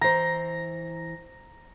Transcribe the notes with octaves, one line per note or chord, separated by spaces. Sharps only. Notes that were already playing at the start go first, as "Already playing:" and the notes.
E3 C5 A#5